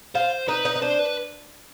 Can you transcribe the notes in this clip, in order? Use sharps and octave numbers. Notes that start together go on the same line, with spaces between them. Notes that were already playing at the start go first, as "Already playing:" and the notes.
F4 C5
D#4 B4
D#4
D#4
D4 C5
B4